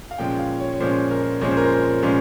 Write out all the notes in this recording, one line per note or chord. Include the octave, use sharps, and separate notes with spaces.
F5
A#2 F3 G#3 C#4 G5
F5
C#5
C#5
A#2 F3 G#3 C#4 C5
A#4
A#2 F3 G#3 C#4 C#5
C5
A#4
C5
A#2 F3 G#3 C#4